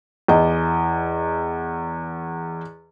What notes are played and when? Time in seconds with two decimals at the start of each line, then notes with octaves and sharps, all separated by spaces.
0.28 E2 D#5